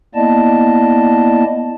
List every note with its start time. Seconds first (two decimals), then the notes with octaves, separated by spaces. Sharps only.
0.15 A#3 B3 E4 D5 D#5 A5